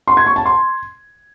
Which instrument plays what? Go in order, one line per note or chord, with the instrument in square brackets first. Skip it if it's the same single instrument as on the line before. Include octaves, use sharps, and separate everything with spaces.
[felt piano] C6
G#6
C#6
A5
C6